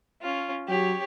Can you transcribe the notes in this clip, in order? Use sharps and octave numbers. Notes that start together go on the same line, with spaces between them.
C#4 F4
F#3 G4 C#5